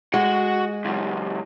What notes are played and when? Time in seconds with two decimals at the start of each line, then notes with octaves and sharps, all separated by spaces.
0.14 G#3 F#4 F#5
0.85 C#2 F#2